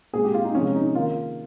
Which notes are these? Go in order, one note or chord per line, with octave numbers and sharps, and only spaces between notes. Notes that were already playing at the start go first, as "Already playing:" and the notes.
A#2 G#3 C4 G#4
G4
F4
D#4
C3 F3 G#3 C#4
D#4
D#3 A#3 F4